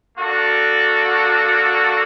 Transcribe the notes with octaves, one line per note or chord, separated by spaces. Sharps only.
A#3 D4 F#4 A4